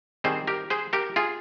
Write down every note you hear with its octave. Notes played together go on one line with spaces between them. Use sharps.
D#3 G3 C4 G#4 C5
G4 A#4
G#4 C5
G4 A#4
F4 G#4